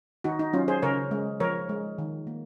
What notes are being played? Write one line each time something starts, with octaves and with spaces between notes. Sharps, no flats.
D#3 D#4 F#4
D#4
F#3 C#4 F4
G#4 C5
C#3 A#4 C#5
G#3
F3 A#4 C#5
G#3
D#3
A#3